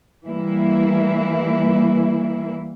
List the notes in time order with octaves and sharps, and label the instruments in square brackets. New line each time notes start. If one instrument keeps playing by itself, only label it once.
[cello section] E3 G3 A#3 E4